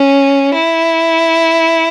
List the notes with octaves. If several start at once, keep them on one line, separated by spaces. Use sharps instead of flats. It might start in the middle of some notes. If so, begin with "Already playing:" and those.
Already playing: C#4
E4